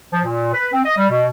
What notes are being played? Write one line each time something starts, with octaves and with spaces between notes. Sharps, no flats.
F3
A#2
B4
C4
D#5
G3
B2